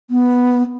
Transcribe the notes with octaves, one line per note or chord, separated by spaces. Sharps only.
B3